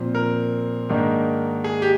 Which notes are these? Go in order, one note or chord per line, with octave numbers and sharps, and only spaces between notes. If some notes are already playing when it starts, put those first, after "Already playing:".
Already playing: A#2 F3 C4
A#4
G#2 D#3 A#3 D4
G#4
G4